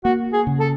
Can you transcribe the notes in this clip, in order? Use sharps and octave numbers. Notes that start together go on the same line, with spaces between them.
A#3 F#4
G#4
C#3
A4